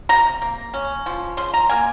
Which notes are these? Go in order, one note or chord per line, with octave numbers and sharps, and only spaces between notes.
C3 A#5
A#3
C#4
F3
C#3 C6
A#5
A#3 G#5